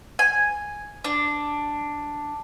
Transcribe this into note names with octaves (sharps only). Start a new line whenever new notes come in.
G#5
D4